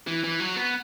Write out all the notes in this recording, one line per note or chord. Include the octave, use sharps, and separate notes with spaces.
E3
E3
F#3
B3